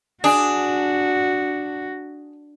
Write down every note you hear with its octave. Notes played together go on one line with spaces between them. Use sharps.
D4 F#4 G#4